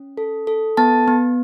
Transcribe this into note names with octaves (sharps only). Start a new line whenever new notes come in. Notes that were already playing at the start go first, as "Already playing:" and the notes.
Already playing: C#4
A4
A4
B3 A5 A6
B3